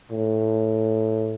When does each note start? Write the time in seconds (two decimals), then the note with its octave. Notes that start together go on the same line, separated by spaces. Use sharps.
0.11 A2